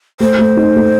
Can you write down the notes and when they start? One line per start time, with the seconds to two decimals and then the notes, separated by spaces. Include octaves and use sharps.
0.20 A3 C5
0.39 A3
0.57 D#4
0.76 A3